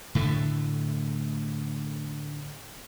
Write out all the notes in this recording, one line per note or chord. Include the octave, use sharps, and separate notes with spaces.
A2 D3 A3